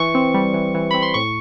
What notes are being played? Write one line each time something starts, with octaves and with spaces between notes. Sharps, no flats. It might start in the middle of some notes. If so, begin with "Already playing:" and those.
Already playing: E3 C#6
C4
G3
E3
E3
C4 B5
C6
A2 C#6